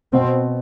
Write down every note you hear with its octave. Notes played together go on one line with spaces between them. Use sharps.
B2 C4